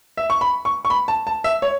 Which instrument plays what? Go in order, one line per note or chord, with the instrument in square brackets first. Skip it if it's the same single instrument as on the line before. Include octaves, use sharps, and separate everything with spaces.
[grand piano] E5
C#6
B5
C#6
C#6
B5
A5
A5
E5
C#5